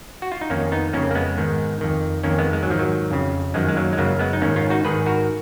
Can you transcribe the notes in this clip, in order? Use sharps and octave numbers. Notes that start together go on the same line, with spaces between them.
F#4
F4
D#4
F2 D#3 A#3 C#4
B3 D#4
F2 C#3 A#3 C#4
A#3
G#3 B3
G#2 D#3
F2 D#3
F2 D#3 A#3 C#4
G#3 B3
G#3
F#3
G#2 D#3 F3
F#3
F2 C#3
F#2 D#3 F3 G#3
G#3
F#3 A#3
G#3
F#2 C#3 F#3 A#3
G#3 B3
D#4
G#2 D#3 A#3 C#4
C#4 F4
D#4 F#4
G#2 D#3 G#4 B4
F#4 A#4